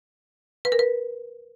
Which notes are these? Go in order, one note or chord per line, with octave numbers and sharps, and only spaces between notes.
B4
A#4
B4